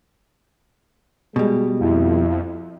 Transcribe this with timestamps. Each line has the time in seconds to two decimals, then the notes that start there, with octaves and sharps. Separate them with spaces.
1.36 B2 G3 G#3
1.81 F2 E4